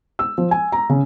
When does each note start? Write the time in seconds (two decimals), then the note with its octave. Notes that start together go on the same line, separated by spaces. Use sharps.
0.19 E6
0.38 F3
0.51 G#5
0.72 A#5
0.89 C#3